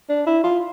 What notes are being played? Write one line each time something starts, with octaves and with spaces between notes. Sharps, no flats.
D4
E4
F4